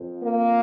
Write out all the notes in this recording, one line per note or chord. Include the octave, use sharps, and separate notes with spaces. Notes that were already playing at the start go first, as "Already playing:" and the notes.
Already playing: F2 F3
A#3